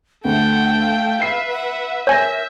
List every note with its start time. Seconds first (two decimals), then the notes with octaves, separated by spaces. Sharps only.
0.25 D2 A3 F#5 G5
0.80 F5
1.22 B4 E5 C7
1.50 F#5
2.07 A#4 C#5 E5 G#5 G6 A#6